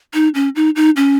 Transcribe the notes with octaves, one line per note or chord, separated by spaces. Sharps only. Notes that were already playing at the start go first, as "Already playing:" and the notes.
D#4
C#4
D#4
D#4
C#4